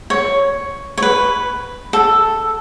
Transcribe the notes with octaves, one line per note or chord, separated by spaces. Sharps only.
C#5
C#5
B4
A4